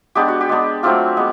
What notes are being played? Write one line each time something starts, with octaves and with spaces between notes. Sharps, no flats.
G#3 B3 D4 G4
F#4
G4
G#3 B3 D4
F#3 A3 C4 F4 G4
G#3 B3